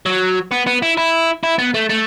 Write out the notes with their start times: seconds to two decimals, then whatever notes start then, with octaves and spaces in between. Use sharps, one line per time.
0.06 F#3
0.52 B3
0.67 B3
0.82 E4
0.97 E4
1.43 E4
1.59 B3
1.74 A3
1.89 A3